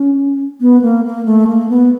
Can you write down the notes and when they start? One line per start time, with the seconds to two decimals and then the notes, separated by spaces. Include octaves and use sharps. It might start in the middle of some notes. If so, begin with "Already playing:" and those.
Already playing: C#4
0.61 B3
0.82 A#3
1.05 A#3
1.25 A3
1.47 A#3
1.69 B3